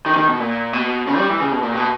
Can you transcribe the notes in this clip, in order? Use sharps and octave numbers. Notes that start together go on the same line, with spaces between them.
D#3
E3
D#3
B2
A#2
B2
C#3
G3
E3
C#3
B2
A#2
B2